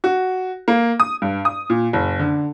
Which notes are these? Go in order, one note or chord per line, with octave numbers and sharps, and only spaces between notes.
F#4
A#3
D#6
G2
D#6
A#2
F#1
D3